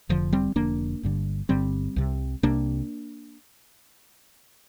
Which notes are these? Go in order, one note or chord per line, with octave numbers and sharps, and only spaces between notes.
F1 F2 D3 F3
G3 C4
F1 F2 D3 A#3 D4
G1 G2 D3
G1 G2 D3 G3 C4
C2 C3
C2 C3 A#3 D4